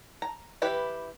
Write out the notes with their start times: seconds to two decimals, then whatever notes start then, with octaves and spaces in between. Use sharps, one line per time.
0.22 A#5
0.62 E3 E4 G4 B4